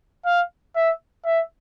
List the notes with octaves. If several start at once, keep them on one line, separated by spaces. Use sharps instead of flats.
F5
E5
E5